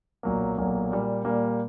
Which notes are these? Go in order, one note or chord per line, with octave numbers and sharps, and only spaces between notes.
B1 A#2 F#3 A#3
B1 A#2 F#3 A#3
A#2 G3 A#3
A#2 G3 A#3